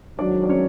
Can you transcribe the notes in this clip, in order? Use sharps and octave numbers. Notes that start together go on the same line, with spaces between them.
G#2 D#3 F#3 D4 D5
D5
C#4 C#5